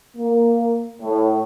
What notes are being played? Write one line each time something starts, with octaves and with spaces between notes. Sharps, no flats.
A#3
A2